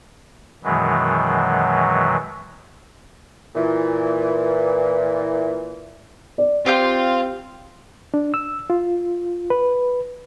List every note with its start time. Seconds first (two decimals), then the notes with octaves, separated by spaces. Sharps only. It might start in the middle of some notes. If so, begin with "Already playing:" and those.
0.64 F#2 B2 D#3 E3 F#3 G#3
3.55 A#2 E3
6.38 D5
6.66 C4 F4 G4 F5 G6
8.14 D4
8.34 E6
8.70 F4
9.50 B4